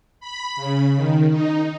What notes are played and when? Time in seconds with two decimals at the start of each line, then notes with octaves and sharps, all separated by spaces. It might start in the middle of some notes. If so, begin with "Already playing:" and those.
0.20 B5
0.56 C#3
0.96 D#3
1.29 D#4